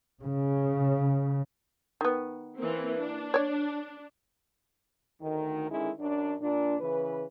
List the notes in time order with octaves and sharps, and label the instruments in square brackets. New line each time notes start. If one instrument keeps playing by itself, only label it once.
[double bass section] C#3
[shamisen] D#3 B3
[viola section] E3 A#3 C4
D4
[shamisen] C#5 D5
[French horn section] D2 D#3
D3 D#3 G#3 C#4 D#4 E4
F#2 D4
A#2 D4
C#3 E3 B4